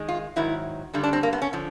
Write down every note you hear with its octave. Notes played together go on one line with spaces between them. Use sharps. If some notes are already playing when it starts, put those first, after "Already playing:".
Already playing: D#3 G#3
F4
G#2 D#3 F#3 E4
G2 D3 G3
D4
C4
A#3
B3
C#4
D3 F3